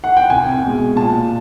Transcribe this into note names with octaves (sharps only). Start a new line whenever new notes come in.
F#5
G5
C2 G#5
B2 G#3
A#2 A5